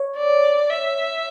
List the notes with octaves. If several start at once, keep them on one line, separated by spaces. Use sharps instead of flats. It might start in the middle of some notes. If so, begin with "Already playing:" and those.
Already playing: C#5
D5
E5